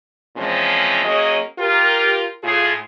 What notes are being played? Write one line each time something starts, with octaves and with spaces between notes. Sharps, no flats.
A#2 E3 F3 G#3 C4 C#4
F#3 A#3 C#4 G#4 D#5
F4 G4 A#4
A2 F4 G#4